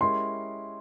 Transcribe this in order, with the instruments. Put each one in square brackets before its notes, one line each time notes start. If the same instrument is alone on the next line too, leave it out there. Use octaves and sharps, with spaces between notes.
[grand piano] G#3 C#4 E4 G4 A#4 [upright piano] C6